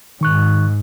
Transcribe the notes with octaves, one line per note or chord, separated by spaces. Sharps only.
G#2 D#3 C#6 F#6